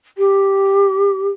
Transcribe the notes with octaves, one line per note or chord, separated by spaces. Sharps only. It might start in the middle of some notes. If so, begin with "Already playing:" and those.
G4